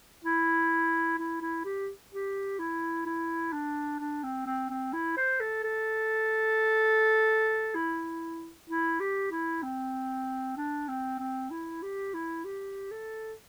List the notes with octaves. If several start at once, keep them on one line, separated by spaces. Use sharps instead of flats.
E4
E4
E4
G4
G4
E4
E4
D4
D4
C4
C4
C4
E4
C5
A4
A4
E4
E4
G4
E4
C4
D4
C4
C4
E4
G4
E4
G4
A4